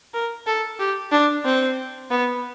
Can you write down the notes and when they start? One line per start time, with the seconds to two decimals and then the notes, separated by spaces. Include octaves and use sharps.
0.14 A#4
0.47 A4
0.80 G4
1.12 D4
1.45 C4
2.11 B3